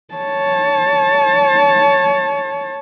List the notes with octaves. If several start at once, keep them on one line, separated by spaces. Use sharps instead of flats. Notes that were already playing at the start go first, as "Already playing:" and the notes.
C#5 A5